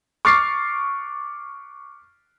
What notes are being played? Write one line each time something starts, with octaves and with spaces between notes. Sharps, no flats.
C#6 D6 F6 A6 C7